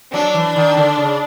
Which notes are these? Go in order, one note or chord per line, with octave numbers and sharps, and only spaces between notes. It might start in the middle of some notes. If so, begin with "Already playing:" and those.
F#3 D4
E3
D#3
D3
C#3